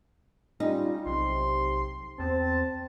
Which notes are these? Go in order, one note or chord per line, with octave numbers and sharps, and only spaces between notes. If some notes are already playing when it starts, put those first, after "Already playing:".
G3 C#4 D#4 F4
B1 C3 C6
E2 C4 A5